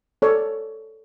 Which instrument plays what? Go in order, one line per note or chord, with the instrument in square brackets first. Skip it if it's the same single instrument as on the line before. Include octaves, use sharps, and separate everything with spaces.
[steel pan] A4 C#5 D5